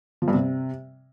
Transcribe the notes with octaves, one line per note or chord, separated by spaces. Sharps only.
F3
G2
C3